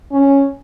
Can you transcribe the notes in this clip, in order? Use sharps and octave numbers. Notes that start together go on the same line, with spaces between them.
C#4